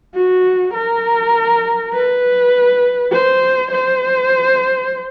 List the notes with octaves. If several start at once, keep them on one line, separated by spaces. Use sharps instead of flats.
F#4
A#4
B4
C5
C5